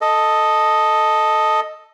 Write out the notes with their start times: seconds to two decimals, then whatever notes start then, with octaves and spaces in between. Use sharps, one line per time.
0.01 A4 D#5